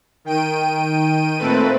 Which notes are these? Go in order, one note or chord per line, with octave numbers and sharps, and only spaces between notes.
D#3 G5 D7 D#7
A#2 A3 C4 A4 B4